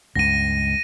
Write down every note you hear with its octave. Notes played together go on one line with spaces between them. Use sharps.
C#2 G2 A#6 D#7